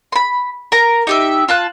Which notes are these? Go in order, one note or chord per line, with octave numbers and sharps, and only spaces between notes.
B5 C6
A#4 A#5
D#4 G4 E5
F4 A5 F#6